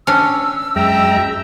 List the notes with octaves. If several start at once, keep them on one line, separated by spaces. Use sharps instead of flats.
C#4 D4 E6
F#2 G#3 E5 G5 A#5